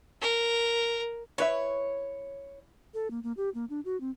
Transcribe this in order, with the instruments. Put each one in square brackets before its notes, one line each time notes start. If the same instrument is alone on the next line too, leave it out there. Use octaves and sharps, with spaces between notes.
[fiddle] A#4
[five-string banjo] E4 B4 E5 [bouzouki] C#5
[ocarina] A4
A#3
A#3
G4
A#3
D4
F#4
C4